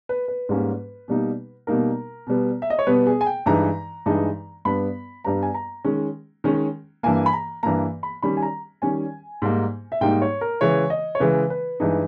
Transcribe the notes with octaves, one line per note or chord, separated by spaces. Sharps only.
B4
B4
G#2 G3 A#3 C#4
B2 G3 A#3 D#4
B2 G3 A#3 D#4 A#4
B2 G3 B3
E5
D#5
C#5
B2 G3 B3 B4
G#4
G#5
G5
G2 E3 G#3 D#4 A#5
G2 E3 G#3 D#4
G2 G3 B3 B5
G2 G3 B3 A#5
G#5
A#5
D#3 G#3 C#4
D#3 G#3 C#4
G2 E3 A#3 G#5
B5
A#5
G2 E3 A#3 A#5
B5
D#3 G3 C#4 B5
G#5
A#5
D#3 G3 C#4 G#5
G#2 G3 A#3 D#4
E5
G#2 G3 A#3 D#4 G5
C#5
A#4
C#3 E3 G#3 C#5
D#5
C#5
C#3 E3 G#3 B4
B4
G2 E3 G#3 D#4